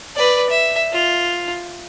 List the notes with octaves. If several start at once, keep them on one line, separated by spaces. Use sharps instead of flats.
B4 D5
E5
F4